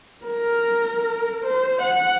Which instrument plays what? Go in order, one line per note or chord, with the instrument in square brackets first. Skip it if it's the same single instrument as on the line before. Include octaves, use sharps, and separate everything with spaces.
[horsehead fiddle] A#4
C5
F#5